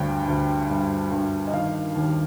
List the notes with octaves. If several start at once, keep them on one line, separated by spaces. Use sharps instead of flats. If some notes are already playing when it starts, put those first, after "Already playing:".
Already playing: D2 G2 G5
D2
G2
G2
D#5
D#3 F5
D#2